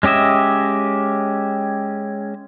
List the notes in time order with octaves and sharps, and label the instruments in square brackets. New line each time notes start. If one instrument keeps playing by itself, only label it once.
[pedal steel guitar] G#3 C#4 G4 D#5 E5